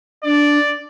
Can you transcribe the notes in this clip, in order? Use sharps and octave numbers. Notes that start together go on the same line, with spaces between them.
D4 D5